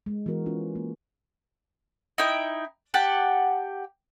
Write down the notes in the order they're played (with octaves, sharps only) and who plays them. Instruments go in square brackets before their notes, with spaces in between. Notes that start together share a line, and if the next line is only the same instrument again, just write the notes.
[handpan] G#3
E3 B3 F#4 A#4
C#4 F4
A#3
[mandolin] D#4 E4 G5
G4 F#5 A5